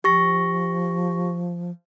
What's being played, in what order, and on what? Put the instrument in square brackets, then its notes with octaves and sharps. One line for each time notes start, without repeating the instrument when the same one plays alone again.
[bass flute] F3 [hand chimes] G4 C#6 A#6